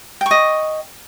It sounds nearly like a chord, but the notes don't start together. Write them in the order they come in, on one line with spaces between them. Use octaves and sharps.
G5 C#6 D#5